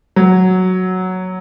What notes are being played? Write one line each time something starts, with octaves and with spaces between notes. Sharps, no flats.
F#3